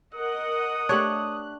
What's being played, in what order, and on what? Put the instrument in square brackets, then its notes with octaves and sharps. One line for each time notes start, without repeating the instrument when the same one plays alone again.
[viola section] A#4 D#5 F#5 [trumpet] D#6
[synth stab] A3 G4 F#6 [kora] D4 C#5